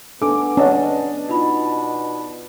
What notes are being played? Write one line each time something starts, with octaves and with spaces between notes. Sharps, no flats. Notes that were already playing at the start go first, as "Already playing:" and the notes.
B3 D4 A4 G#5 D6
C#4 D4 D#5 F#5 A5
B2 D#4 F4 B5